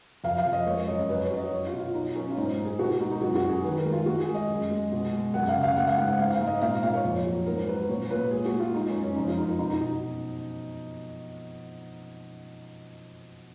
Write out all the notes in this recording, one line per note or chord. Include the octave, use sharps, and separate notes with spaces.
F2 F5
F5
F2
D#5
G#3 C#5
C#5
F#2 D#5
D#5
F#2 B4
C#5
F#3
D#5
F#3 C#5
F4
B2
F4
F#3 D#4
F#3 C#4
F4
G#2 D#4
G#2
G#4
B2 F#4
F#4
G#3 D#4
D#4
F#2 F#4
F#4
F#2
G#4
D#3 B4
A#4
G#3
F4
G#3 F#4
G#4
G#3
D#5
F#2
G#3
B2
G#3
F#2 F#5
F5
C#3
F5
G#3 F#5
F5
G#2 F#5
F#5
G#2 F5
F5
G#2
D#5
A#2 F5
A#2 F5
C#5
F2
F#3
G#2 A#4
F#3 B4
A#2 C#5
A#2 B4
G#3 G#4
F#4
G#3
F4
G#3 D#4
C#4
F#2
C#4
F2 D#4
F4
F#3 D#4
D#4
B2 D#4
D#4
B2